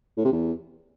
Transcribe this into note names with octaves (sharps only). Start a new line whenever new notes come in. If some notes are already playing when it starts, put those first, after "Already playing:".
A2
C3
E2